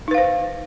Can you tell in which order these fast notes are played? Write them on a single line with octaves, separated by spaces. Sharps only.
D#4 B4 F5 C5